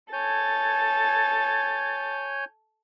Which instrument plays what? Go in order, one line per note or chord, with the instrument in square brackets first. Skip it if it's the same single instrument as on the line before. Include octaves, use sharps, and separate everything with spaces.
[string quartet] A4 A6 [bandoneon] C#5 G#5 G6